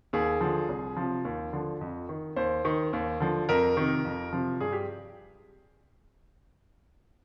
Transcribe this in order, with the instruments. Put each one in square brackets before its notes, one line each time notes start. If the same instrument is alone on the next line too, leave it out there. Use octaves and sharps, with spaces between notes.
[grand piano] D#2 G#4
D3 F3
C2
C3 F3
D#2
D3 F3
F2
D#3
D#2 C5
D#3
D#2
D3 F3
F2 A#4
C3 D#3
F2
C3 F3
G2 G#4
G4